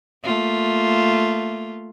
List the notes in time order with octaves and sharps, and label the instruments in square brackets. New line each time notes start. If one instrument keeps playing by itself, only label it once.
[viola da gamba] A3 A#3 F4